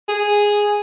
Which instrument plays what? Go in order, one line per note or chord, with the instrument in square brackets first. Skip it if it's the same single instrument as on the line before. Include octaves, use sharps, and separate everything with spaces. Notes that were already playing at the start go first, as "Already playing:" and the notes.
[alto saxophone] G#4